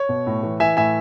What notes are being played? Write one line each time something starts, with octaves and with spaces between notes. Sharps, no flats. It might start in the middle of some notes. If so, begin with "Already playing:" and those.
Already playing: C#5
B2
A2
E3
E3 E5 G#5
A2 E5 G#5